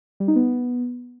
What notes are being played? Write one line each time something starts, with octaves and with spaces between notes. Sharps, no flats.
G3
D#4
B3